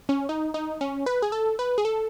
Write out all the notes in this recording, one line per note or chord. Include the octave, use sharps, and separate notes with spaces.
C#4
D#4
D#4
C#4
B4
G#4
A4
B4
G#4
A4